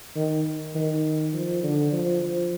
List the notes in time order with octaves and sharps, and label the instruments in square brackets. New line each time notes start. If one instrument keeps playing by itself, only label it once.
[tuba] D#3
D#3
F3
D3
F3
F3